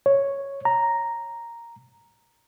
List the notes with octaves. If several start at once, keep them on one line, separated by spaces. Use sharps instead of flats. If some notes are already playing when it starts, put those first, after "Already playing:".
C#5
A#5